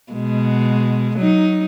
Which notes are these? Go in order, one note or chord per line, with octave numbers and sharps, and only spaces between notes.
B2 G#3
F#3 D#4